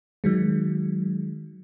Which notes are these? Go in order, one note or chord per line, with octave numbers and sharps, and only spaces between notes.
D#3 F#3 G#3